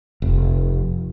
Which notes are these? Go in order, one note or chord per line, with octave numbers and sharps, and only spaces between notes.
F1